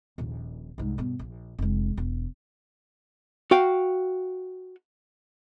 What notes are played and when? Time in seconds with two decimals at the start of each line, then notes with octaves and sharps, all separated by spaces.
0.18 D#1 A#1
0.78 C2 G#2
0.98 G2 B2
1.19 A#1
1.59 F1 G#3
1.97 E1
3.51 F#4 F5 G5